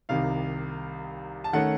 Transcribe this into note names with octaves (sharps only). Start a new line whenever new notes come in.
C2 C3 D#3 F5
A5
D#3 A3 C#4 F#5